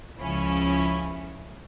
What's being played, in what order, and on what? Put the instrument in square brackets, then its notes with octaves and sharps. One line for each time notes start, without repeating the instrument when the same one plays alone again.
[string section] C#2 C#3 F3 C#4 E4